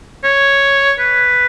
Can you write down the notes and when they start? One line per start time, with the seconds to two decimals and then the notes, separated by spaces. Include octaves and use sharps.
0.24 C#5
0.99 B4